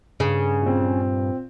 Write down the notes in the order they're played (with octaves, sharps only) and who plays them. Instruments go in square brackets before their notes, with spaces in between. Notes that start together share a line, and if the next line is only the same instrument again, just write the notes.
[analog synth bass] G2 [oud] C#3
[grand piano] A#2 C4